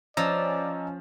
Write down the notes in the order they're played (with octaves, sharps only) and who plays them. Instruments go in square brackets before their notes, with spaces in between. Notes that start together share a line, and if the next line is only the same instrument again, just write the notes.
[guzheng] F3 [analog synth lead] C#4 [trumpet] D5 [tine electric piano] D#5 A#5 E6